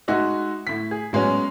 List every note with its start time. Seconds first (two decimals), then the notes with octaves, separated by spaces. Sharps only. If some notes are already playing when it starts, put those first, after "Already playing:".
0.08 G#3 D#4 F#4 D#5 E5
0.67 A2 B6
0.91 G#4
1.13 F#3 G#3 B3 C#4